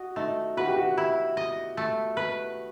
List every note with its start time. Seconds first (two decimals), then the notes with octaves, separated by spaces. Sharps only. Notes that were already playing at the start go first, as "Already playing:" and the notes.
Already playing: F#4 D#5
0.16 A3 D#4
0.57 F#4 B4
0.67 G4
0.76 F#4
0.98 E4
1.37 D#5
1.77 A3
2.17 B4